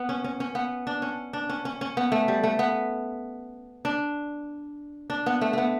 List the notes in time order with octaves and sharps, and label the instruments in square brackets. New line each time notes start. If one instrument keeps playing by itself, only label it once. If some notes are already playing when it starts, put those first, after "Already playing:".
Already playing: [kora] B3
C#4
C#4
C#4
B3
D4
C#4
D4
C#4
C#4
C#4
B3
A3
G3
A3
B3
D4
D4
B3
A3
A3 B3